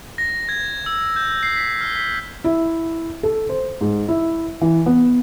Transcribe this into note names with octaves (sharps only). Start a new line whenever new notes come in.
A#6
G#6
E6
G6
C7
B6
F6
B6
E4
A4
C5
G#2
E4
E3
B3